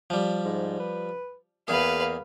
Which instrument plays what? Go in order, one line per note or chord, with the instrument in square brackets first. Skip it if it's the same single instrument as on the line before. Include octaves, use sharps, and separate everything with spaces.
[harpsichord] F3 G3
[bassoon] G#2
B4
[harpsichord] E2 G#4 [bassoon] A#3 [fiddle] B4 F5